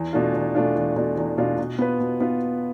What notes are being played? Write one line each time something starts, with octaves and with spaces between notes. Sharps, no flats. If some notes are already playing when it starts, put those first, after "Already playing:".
Already playing: E2
B2 A3 D4 F4
E2
B2 A3 D4 F4
E2
B2 A3 D4 F4
E2
B2 A3 D4 F4
B2
B3 F4 B4
B2
B3 F4 B4